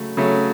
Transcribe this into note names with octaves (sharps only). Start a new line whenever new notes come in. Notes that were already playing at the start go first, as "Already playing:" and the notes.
Already playing: C#3 F#3 A3
C#3 F#3 A3